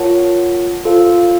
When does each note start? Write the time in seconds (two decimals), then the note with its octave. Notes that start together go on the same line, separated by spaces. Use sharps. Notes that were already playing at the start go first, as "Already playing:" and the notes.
Already playing: F4 A#4 C#5 F#5 A5
0.85 F4 A4 C5 F5